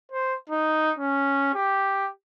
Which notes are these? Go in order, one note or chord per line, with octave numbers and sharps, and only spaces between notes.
C5
D#4
C#4
G4